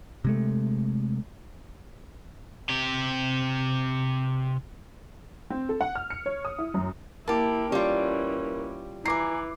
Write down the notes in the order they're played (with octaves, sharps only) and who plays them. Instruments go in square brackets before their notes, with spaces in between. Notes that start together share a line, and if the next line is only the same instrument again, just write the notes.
[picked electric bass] C3 G#3 A3
[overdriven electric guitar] C3 G4
[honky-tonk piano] C4
A4
F#5
F6
C#7
C#5
D#6
E4
F#2
[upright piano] A#3 [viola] E4 [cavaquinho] G4 A5
[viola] E3 C#4 [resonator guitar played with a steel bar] G3 F4
[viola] E3 [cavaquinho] G#5 A#5 [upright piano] D6 C7